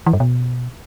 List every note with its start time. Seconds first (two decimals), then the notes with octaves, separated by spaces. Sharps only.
0.06 E3
0.13 G2
0.20 B2